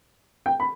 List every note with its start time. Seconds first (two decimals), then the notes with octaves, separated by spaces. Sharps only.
0.46 G5
0.60 B5